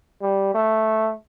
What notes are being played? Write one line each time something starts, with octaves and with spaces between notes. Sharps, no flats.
G3
A3